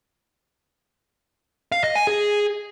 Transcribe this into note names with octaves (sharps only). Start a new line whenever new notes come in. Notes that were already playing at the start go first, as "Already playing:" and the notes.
F5
D#5
G#5
G#4